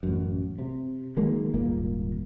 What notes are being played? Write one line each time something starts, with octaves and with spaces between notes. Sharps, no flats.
A1 F#2
C3
D#3 F#3 G#3 A#3
D#1 G#1 A#2 A#3